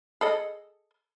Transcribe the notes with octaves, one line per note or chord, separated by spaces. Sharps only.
G#4 A4 D#5